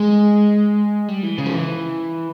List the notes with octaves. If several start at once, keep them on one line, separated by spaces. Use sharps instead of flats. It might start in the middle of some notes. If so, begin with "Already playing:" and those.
Already playing: G#3
G3
E3
C#3
F3
E3